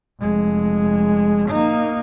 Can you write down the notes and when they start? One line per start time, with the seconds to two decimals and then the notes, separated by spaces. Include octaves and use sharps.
0.21 F1 G#3
1.49 A#3 D#4